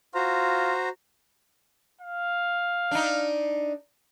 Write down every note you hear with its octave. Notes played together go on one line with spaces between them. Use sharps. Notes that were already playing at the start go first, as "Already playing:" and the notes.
F4 F#4 C5 A#5
F5
D4 D#4